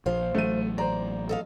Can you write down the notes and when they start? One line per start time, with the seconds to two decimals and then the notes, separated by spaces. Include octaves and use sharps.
0.06 A#1 F3 C5 F5
0.35 A1 F#3 A3 D#7
0.78 C5 D5 A#5
1.29 A4 D#5 F5